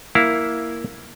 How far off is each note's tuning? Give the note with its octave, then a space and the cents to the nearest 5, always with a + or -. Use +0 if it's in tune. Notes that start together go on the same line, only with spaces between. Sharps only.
A#3 +0 E4 +0 F5 +10